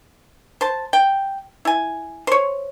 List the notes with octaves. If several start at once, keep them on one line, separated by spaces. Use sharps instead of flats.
C5 A5
G5
E4 G#5
C5 C#5